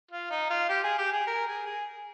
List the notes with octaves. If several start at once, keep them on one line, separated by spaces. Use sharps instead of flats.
F4
D#4
F4
G4
G#4
G4
G#4
A#4
G#4
G#4